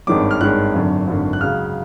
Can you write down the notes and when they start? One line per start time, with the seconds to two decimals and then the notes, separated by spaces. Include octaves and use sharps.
0.07 G#1 G2 D#3 G#3 C#4 D6
0.31 F6
0.40 G#1 G2 D#3 G#3 C#4 F#6
0.74 G#1 F#2 D3
1.07 G#1 F#2 D3
1.33 F#6
1.41 C#2 C#3 F#3 F6